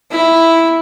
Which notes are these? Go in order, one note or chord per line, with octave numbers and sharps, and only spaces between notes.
E4